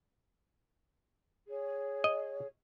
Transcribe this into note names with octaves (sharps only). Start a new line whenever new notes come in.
G#4 C#5
D#5